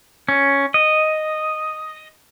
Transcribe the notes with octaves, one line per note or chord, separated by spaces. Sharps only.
C#4
D#5